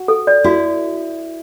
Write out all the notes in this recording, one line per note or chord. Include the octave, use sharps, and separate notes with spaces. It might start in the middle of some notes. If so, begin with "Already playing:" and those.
Already playing: F#4
A4
D5
E4 F#4